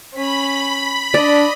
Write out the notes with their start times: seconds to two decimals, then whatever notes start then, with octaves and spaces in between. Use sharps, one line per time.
0.14 C#4 B5
1.14 D4 D5 D#5